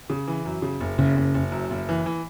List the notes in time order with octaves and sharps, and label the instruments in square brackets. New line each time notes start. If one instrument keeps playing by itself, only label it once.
[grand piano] C#3
E3
F#2
C#3
F#1
[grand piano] F#1 [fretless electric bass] C#3
[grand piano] F#1
F#1
F#2
F#1
E3
E3